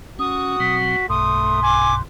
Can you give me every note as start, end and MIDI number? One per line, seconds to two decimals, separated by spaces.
0.19 0.57 61
0.19 1.09 66
0.19 0.74 87
0.60 0.96 47
0.60 0.96 54
0.60 0.96 60
0.60 1.08 95
1.09 2.02 35
1.09 2.02 43
1.09 2.02 47
1.09 1.62 57
1.09 2.00 84
1.09 1.60 87
1.63 1.94 80
1.63 1.95 86